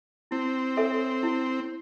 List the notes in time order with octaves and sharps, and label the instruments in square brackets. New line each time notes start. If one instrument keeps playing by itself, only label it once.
[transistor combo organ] C4 [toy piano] E4
[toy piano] A4 C#5 E5 G#5
E4